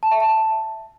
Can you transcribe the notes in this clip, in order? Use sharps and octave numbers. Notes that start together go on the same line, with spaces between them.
A5
E5
A5